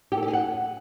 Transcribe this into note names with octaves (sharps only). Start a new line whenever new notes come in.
G4
A4
G4
G#4
F#5